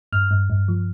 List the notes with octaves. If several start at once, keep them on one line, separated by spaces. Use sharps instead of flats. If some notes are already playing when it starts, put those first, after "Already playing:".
G2 F6
G2
G2
F3